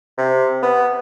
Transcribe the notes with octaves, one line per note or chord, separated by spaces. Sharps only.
C3
B3